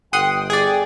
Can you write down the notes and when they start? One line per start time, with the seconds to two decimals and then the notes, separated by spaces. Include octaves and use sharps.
0.13 G1 F#5 G5 C6 D#6
0.50 G#4 D5